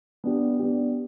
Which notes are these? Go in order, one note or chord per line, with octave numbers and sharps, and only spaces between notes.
B3 D4 G4
B3 D4 G4